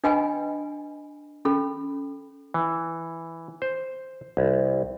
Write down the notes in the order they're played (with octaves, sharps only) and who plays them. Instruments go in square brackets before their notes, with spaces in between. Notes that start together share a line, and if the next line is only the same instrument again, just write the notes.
[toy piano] D4 B4 D#5 G5 G#5 B5
C#4 A4 B5
[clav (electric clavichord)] E3
C5
C2